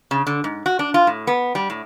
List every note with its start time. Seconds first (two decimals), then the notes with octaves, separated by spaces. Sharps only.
0.11 C#3
0.27 D3
0.44 G#2
0.66 F#4
0.79 D4
0.94 F4
1.07 A2
1.27 B3
1.55 G3
1.70 A2